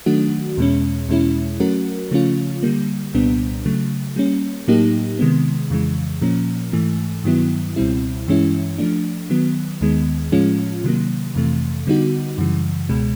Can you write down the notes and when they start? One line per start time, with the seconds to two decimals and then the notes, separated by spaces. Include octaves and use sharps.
0.06 D#3 F#3 A3 D4 F#4
0.57 E2 B2 G#3 C#4
1.09 E2 B2 G#3 C#4 E4
1.60 F#3 A3 C#4 F#4 A#4
2.11 C#3 F3 A3 C#4 F4
2.63 D3 G3 A#3
3.14 C2 A#2 G3 B3 D4
3.65 C#3 F#3 A3
4.16 G3 A#3 C#4
4.68 A2 F#3 A#3 D#4 G4
5.19 C3 D#3 G#3 B3
5.70 F2 C#3 E3 G#3
6.22 A#2 F3 A#3 C#4
6.73 G#2 E3 A3
7.24 G2 D#3 F#3 B3 E4
7.76 C#2 B2 G3 C4 E4
8.28 G2 E3 G#3 C#4 E4
8.78 F3 A3 D4
9.30 D#3 F#3 B3
9.81 D#2 D#3 G#3 B3
10.32 A2 F3 G#3 C#4 F4
10.84 C3 D#3 F#3 A#3
11.35 F2 C3 E3 A3
11.87 D3 G3 B3 D#4 F#4
12.38 F#2 C#3 E3 G3
12.89 C#2 B2 G#3